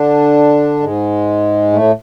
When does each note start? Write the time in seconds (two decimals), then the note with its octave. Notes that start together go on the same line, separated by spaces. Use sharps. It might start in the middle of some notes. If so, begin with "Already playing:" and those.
Already playing: D3 D4
0.80 G#2 G#3
1.72 A2 A3